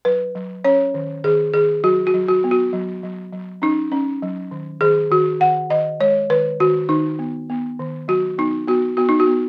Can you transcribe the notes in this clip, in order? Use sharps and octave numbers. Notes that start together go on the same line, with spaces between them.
F#3 B4
F#3
C#4 C#5
D#3
D#3 G#4
D#3 G#4
F#3 F#4
F#4
F#3
F#4
B3
F#4
F#3
F#3
F#3
C#4 D#4
C#4
F#3
D#3
D#3 G#4
D#3 F#4
D#3 F#5
D#3 D#5
G#3 C#5
D#3 B4
D#3 F#4
D#3 D#4
B3
B3
D#3
F#3 F#4
B3 D#4
B3 F#4
B3 F#4
D#4
F#4
B3